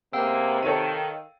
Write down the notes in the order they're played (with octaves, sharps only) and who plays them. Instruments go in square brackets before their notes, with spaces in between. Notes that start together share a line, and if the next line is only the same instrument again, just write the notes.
[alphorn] C3 [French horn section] G#3 A#3 B3 [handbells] F5 G5 E6
[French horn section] D#3 [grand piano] A4 C#5 D#7